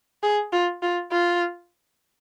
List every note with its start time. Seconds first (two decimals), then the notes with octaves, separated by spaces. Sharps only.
0.23 G#4
0.53 F4
0.82 F4
1.12 F4